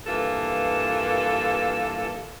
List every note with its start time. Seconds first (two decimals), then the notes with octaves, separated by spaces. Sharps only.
0.07 G2 E3 A#3 F4 A4